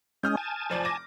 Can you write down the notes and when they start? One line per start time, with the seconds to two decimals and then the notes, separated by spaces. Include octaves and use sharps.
0.23 G#3 C#4 D#6 F6 G6
0.37 G#5 A5
0.70 F1 F3 D5
0.85 D6 A#6